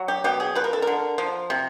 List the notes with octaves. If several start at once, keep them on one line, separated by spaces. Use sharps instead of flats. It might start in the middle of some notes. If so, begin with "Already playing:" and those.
Already playing: F#3
G4
B2 G4
G#4
F3 B4
A#4
A4
D3 A#4
F3
C3